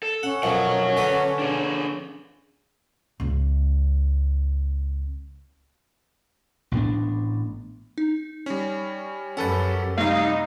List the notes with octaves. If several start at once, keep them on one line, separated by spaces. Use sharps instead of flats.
A4
C#4 F#5
B1 F#2 F3 C#5 F#5
D3 A4 B4
D4 G#4
C#2 C#3
A1 A2 B3 D4
D#4
G3 C#4
F#2 C#4 G4 A4 B4 F#5 A6
C3 G3 A3 D#4 F5